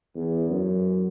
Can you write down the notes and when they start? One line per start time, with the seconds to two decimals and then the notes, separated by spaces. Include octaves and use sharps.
0.15 E2
0.50 F#2